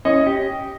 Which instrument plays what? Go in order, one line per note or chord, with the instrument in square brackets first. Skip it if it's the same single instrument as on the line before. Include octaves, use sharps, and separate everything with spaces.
[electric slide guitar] C#4 [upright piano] D#5
[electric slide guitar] G4